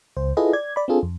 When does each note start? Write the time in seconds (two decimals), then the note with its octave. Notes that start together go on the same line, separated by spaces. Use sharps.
0.17 C#2 C5
0.37 E4 F4 G#4 A4 B4 D#5
0.53 D5 G#6
0.76 D5 B5
0.88 C4 D4 F4 G#4 A4
1.03 F2